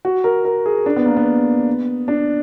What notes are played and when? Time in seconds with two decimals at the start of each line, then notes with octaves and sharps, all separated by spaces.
0.05 F#4
0.24 A#4
0.45 A#4
0.66 G#4
0.86 D4
0.96 B3
1.06 A#3
1.16 B3
2.08 D4